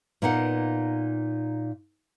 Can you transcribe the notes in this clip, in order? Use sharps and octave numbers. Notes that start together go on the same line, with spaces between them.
A#2 A#3 B3 D#4 A#4 F#5